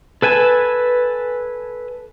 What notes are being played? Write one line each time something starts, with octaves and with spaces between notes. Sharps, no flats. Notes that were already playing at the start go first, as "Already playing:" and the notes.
A4 B4 G#5 A5